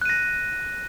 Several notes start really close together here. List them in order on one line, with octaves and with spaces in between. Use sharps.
F#6 D#7 A#6